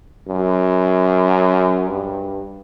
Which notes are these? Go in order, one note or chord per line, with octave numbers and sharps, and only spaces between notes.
F#2
G2